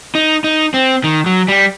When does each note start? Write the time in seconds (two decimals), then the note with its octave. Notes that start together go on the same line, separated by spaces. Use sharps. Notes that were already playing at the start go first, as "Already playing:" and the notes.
0.15 D#4
0.44 D#4
0.74 C4
1.04 D#3
1.26 F#3
1.48 G3